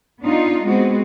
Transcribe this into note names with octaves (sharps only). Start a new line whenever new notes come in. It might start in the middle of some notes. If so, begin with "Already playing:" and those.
B3 D4 D#4 F4
G#3 B3 C4 F#4